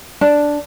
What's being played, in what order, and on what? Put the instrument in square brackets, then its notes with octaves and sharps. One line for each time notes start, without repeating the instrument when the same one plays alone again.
[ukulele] D4